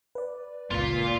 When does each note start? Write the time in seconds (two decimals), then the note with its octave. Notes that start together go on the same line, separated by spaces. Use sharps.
0.15 B4 D5
0.71 G1 C#2 A#2 F4 F5